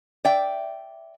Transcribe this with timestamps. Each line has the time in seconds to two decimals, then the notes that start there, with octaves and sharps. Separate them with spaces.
0.25 D5 E5 G5